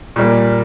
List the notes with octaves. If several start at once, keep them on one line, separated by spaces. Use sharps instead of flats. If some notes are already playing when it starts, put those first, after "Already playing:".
A#2 G3 A#3